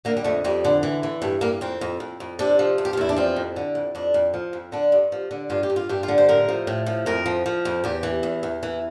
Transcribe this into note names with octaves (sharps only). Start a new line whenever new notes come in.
D3 A#3
G3
F2 A3
F2 G3
D3
E3
E3
G2 A3
G2 A#3
F2 C4
F2
F2
F2
C3 D4
F3
E2
G4
F4
E2 E4
D4
F3 C4
F2
D3
F2
F2 D4
F2
F3
F2
D3 D4
G2
F3
D3
G2 F4
G4
G2
F4
G2 G4
F4
D3
C5
A2 A#4
F3
A2
F3
F2 A#4
F3
F3
F2
E2 G4
E3
E2
E2
E3